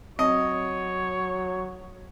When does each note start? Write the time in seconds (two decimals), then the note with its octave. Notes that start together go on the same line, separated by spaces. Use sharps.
0.19 F#3 C4 C#5 D#5